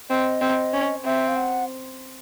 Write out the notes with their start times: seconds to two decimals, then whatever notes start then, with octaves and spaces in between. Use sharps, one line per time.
0.10 C4 D#5
0.41 C4
0.73 C#4
1.05 C4 E5
1.28 F5
1.36 F#5